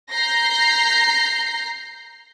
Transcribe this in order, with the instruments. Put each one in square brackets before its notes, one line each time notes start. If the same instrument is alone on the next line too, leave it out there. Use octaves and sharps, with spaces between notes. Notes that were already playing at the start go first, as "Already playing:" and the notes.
[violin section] A#5 G6 A#6 C7